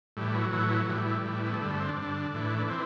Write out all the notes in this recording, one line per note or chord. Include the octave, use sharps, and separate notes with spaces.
A2 E3 G3
F#3
A2 E3
A2 E3 G3
A2 E3
B3
A3
G2 D3 G3
A3
C4
D4
G2 D3
A2 E3
D4
E3 C4